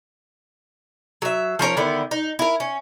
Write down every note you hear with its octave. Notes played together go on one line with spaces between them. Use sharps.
F#3 E5
F3 C#4 A#4 C#5
D3 D#3 B3 E4
D#4
E4 A#4
C#4